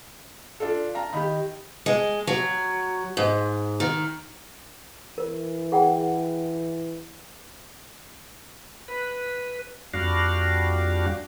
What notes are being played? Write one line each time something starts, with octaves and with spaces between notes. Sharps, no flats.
D4 F4 A4
F5 A5 A#5
D#3 G4 B5
G#3
F#3
G#2
D#3
E3 A#4
G#4 F#5 G5
B4
F2 G3 D4 F#4 F5